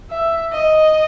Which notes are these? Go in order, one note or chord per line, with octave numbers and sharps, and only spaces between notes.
E5
D#5